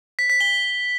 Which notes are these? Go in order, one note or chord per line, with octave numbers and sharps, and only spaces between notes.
B6
B6
G7